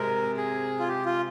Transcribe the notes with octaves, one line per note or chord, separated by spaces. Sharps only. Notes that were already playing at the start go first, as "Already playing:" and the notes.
Already playing: C3 G#3 A#4
G#4
F4
G4
F4